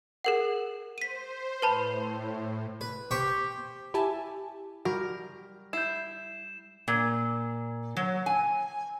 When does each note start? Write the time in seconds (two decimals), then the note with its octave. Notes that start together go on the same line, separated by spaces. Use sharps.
0.25 G#4 A#4 F#5
0.98 C5 B6 D#7
1.62 A2 B4 A5 B5
2.81 B4
3.11 G4 C5 G5 C#6
3.94 E4 G4 E5 G#5 A5
4.85 G3 F#4 A#4
5.73 E4 G6 C7 E7
6.88 A#2
7.97 F#3
8.26 G#5